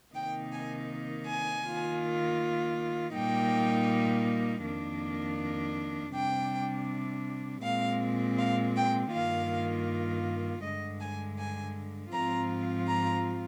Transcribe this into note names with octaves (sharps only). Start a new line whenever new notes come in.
C3 D#3 A#3 D#4 G5
G#5
G#5
D#3 A#3 F4
A#2 G3 A#3 D#4 G5
F2 D#3 A#3 D4
C3 G3 D4 G5
A#2 G#3 C4 F5
F5
G5
G2 D#3 A#3 F4 F5
G2 D3 G#3 D#5
G#5
G#5
G#2 F3 C4 F4 A#5
A#5